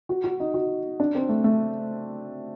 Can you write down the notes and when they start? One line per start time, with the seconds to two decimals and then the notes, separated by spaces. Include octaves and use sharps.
0.09 F#4
0.24 F#4
0.40 D#4
0.54 F#4
1.00 D4
1.15 C4
1.29 A3
1.44 A3